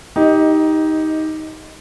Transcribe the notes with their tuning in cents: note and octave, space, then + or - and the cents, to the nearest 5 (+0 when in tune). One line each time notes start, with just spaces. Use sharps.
D#4 +15 G4 +0 D#5 +0